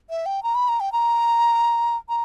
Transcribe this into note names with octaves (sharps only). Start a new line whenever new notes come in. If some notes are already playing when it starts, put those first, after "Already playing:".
E5
G5
A#5
B5
A#5
G5
A#5
A#5